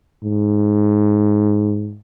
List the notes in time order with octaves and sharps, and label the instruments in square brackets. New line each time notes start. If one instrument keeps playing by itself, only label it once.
[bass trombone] G#2